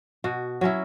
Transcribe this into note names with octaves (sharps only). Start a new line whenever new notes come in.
B2 F#4
F#3 C#4 E4